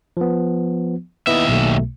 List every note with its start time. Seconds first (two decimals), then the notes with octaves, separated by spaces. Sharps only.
0.17 F3 B3
1.27 D#2 B3 E4 D#5 E5
1.49 B1 B2 A3